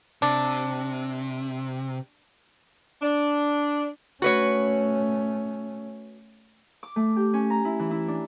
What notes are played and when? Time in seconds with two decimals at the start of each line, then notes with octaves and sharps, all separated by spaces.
0.22 C3 D4
3.02 D4
4.22 A3 C#4 F#4 B4 C#5
6.83 D6
6.96 A3
7.16 G4
7.34 C#4
7.50 A#5
7.65 E4
7.79 E3
7.91 E4
8.08 D4